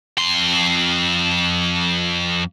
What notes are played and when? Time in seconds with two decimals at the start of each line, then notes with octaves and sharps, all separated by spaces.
0.18 F2 C6